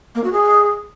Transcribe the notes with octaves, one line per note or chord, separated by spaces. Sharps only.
A#3
F#4
G#4